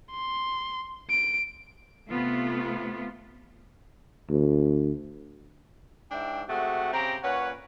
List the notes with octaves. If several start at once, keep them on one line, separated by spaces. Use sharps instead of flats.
C6
D7
C3 A3 B3 F4
D2
G#2 D4 E4 G5
C3 G#3 A3 F#4 F#5
C#3 C4 G4 A#5
A#2 C#4 B4 C#5 F#5